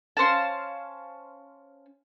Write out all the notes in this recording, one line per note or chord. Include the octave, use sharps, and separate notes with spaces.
C#4 C5 F5 A5